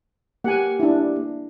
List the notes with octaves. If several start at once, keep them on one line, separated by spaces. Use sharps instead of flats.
A#3 G4 F#5 G#5
D4 E4